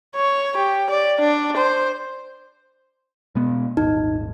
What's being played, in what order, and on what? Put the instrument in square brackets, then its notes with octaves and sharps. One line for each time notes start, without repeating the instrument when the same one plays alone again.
[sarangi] C#5
G4
D5
D4
C5
[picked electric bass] B2 G#3 B3
[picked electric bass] D#1 G#1 [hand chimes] D#4